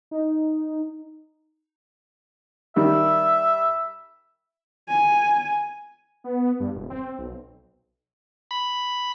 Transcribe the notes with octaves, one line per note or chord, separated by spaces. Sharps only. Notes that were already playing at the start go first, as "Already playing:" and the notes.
D#4
D#3 G3 E5
G#5
B3
G2
E1
C4
B1
B5